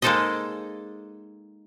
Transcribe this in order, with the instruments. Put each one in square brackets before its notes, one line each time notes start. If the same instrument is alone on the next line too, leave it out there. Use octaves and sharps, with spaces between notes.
[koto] G#3 A#3 D#4 A4 C5 D#5